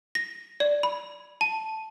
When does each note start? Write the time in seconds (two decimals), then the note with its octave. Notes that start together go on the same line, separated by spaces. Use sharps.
0.15 A#6
0.60 D5
0.83 B5
1.41 A5